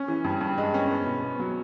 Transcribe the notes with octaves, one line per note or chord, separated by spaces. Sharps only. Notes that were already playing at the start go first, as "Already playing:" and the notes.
Already playing: C#4
E3
G2
G2
G#3
C#4
B3
B2
B3
F#3